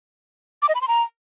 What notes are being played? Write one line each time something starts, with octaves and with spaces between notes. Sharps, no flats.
D6
D#5
B5
C6
A#5